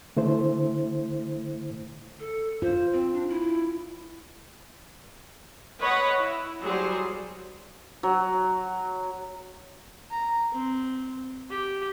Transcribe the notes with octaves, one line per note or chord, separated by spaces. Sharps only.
D3 A3 E4 C5
A4
F4 C5
C4
D4
E4
B4 C#5 D#5 F#5 B5
E4
F#3 G3 G#4 C5
F#3
A#5
C4
G4